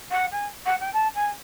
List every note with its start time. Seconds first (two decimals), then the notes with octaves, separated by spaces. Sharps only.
0.11 F#5
0.31 G#5
0.66 F#5
0.80 G5
0.93 A5
1.14 G#5